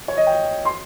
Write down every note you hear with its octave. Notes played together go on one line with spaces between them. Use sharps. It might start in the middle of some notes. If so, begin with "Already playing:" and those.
C#5
D#5
G5
C6